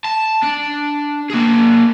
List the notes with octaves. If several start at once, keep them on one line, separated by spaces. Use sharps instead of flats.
A5
D4
A#3 G#4